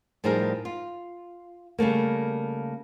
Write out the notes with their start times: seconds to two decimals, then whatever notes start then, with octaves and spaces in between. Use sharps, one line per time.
0.24 A2 F3 G3 D#4 G#4 A#4
0.65 F4
1.78 C#3 G3 A3 A#3